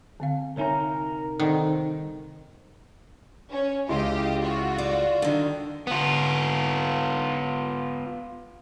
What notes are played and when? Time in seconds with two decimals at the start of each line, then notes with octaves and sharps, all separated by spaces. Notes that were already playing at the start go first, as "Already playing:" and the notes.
0.20 D3 C4 F5
0.57 C2 D#4 A#4 C#5 E5 G#5 A#5
1.40 D#3 C4 A4 D5 F#5
3.51 C#4
3.89 C#2 E4 G4 D#5 F5 C6
4.43 F4 F#4
4.78 D5
5.22 D3 D#3
5.87 B3 F4